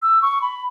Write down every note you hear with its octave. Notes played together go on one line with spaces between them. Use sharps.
E6
C#6
B5